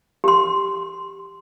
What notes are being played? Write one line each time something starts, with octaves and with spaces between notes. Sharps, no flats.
G4 C6